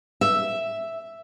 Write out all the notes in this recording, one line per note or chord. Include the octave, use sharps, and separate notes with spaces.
E5